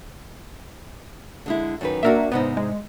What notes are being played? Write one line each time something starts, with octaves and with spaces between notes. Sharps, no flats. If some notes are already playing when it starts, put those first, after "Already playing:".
D3 G#3 E4
F#2 D#3 B4
A#3 D4 F#4 A#4 E5
G#2 C3 B3 D#4
G#3